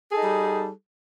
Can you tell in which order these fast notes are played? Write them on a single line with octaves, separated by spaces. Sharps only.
G#4 A4 D#4 G3